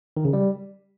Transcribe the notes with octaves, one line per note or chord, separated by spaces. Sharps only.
D#3
C#3
G3